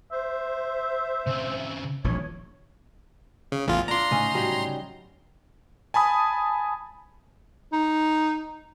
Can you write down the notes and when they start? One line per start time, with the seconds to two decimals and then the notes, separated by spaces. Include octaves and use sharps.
0.12 C5 E5
1.27 C#3 C4
2.04 D#1 A#1 E3 C#5
3.52 C#3
3.68 A1 E2 F4
3.88 D4 F4 A#5 C6
4.11 A2 C#3 C#4 D#4
4.35 F#3 G3
5.94 G#5 A5 B5 D#6
7.73 D#4